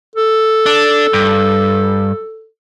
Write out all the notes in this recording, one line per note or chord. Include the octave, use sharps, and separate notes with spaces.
A4
D4
G2